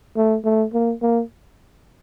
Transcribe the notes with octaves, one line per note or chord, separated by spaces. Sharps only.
A3
A3
A#3
A#3